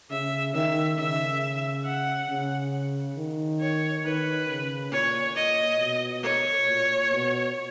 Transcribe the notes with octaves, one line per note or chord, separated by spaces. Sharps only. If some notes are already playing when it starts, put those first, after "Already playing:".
C#3 E5
D#3 E5
C#3 E5
F#5
C#3
D#3
C#5
D#3 B4
C#3
A#2 C#5
D#5
B2
C#5
A#2
B2